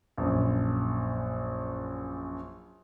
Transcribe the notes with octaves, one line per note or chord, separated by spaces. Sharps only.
A#1 F#2